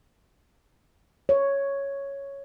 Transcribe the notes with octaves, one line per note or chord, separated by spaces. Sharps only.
C#5